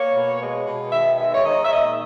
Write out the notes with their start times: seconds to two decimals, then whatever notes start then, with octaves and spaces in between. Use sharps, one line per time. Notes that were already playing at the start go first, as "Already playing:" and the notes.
Already playing: A#3 C#5
0.13 B2
0.40 G#3
0.66 B2
0.91 D#3 E5
1.17 G#3 E5
1.35 C#5
1.44 D#3 D#5
1.63 E5
1.70 A#2 D#5